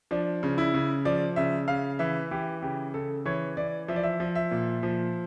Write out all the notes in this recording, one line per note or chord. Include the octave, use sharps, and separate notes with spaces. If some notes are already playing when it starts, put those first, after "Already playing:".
F3 D4
C#3
E4
C#3
F3 D5
C#3 E5
C#3 F5
E3 E5
E3 G4
C#3 G4
C#3 A4
E3 C#5
E3 D5
F3 E5
D5
E5
F3
E5
A#2
F3